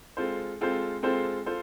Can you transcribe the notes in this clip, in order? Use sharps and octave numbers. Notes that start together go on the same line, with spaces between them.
G#3 C4 F4 A4 C5
G#3 C4 F4 A4 C5
G#3 C4 F4 A4 C5
F4 A4 C5